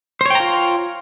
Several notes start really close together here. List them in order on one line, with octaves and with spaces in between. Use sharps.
C5 C#5 G5 A#5 F4